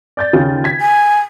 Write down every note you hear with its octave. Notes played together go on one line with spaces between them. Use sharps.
D5 G6 A6
D#2 C#3 F4
G#6 B6
G#5